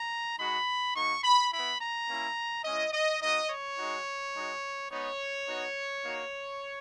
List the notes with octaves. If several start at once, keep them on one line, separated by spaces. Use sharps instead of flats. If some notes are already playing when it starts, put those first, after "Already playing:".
Already playing: A#5
G#3 D#4 F#4 B5
A#3 D#4 F#4 C#6
B5
B3 E4 B5
A#5
A#3 C#4 E4
G#3 C#4 E4 D#5
D#5
A#3 D#4 F#4 D#5
C#5
G#3 D#4 F#4
G#3 D#4 F#4
G#3 B3 D#4 C#5
B3 D#4 F#4
A#3 D#4 F#4